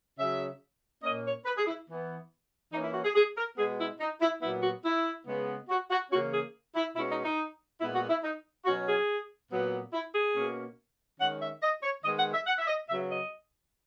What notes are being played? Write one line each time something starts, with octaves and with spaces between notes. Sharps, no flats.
C#3 F#3 C#4 E5
A#2 A#3 C#4 D#5
C#5
B4
G#4
E4
E3 B3
E3 A#3 C#4 D#4
E4
F#4
G#4
G#4
A#4
B2 G#3 B3 G#4
E4
D#4
E4
A#2 F#3 B3 E4
F#4
E4
C#3 G#3 B3
F#4
F#4
C#3 E3 A#3 C#4 F#4
G#4
E4
B2 G#3 C#4 E4
D#4
D#4
A#2 G#3 B3 E4
F#4
E4
D#4
B2 F#3 C#4 F#4
G#4
A#2 F#3 B3
E4
G#4
B2 A#3 C#4
D#3 G#3 C#4 F#5
E5
D#5
C#5
D#3 G#3 B3 D#5
F#5
E5
F#5
E5
D#5
C#3 F#3 B3 E5
D#5